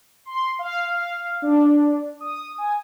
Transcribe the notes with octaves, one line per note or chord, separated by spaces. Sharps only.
C6
F5
F5
D4
D#6
G#5